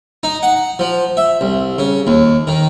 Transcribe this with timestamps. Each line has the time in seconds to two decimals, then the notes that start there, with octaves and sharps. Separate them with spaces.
0.23 D#4
0.43 F#5
0.79 F3
1.17 E5
1.41 C2
1.78 C#3
2.07 D#2
2.47 D#3